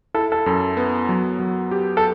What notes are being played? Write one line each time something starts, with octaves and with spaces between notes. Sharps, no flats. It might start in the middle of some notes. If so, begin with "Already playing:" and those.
E4 A4
A4
F#2
B3
F#3
F#3
G4
A4